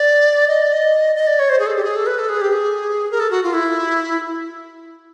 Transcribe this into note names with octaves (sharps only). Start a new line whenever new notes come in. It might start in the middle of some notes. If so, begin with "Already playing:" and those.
Already playing: D5
D#5
D5
D#5
D#5
D5
C#5
C5
G#4
A4
G4
G#4
A4
B4
A4
G#4
G4
G#4
A#4
A4
F#4
F4
E4